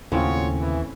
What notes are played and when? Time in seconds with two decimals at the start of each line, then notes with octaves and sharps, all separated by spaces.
0.12 D#2 A2 C#3 C4 C#4 F4 F#4 C#5
0.60 E3